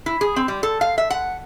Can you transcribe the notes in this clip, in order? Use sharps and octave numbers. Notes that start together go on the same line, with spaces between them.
E4
G#4
C4
G3
A4
F5
E5
F#5